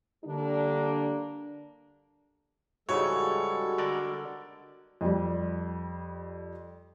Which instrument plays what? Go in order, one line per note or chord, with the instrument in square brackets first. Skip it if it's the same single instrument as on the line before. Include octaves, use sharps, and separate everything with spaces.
[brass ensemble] D3 G3 A#3 D4
[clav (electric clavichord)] G#2 C#3 E3 [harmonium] G3 G#3 A4 [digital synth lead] F#4 [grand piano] C#5
[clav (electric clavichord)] D3 A#4 D5
[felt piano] F2 G3